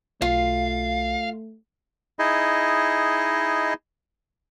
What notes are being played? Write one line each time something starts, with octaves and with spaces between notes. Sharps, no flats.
B1 A3 F4 F5
D#4 E4 G#4 D#5